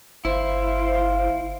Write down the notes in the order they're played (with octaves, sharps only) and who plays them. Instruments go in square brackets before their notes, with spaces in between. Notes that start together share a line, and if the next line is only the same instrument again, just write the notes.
[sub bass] G1 [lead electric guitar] E4 [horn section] C5 F5